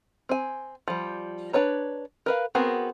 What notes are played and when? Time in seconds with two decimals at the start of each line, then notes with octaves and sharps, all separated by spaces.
0.29 C4 G#5
0.88 F3 G3
1.53 D4 B4 C#5 A#5
2.26 A#4 B4 F5
2.55 B3 C4 F#4 G#4 A#4